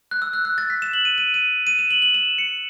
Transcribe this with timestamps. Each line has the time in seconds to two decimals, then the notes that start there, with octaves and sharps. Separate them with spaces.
0.11 F#6
0.22 E6
0.33 F#6
0.45 F#6
0.58 A6
0.70 B6
0.82 E7
0.93 F#7
1.05 D#7
1.18 D#7
1.34 D#7
1.67 D#7
1.79 E7
1.90 F#7
2.02 F#7
2.14 E7
2.38 C#7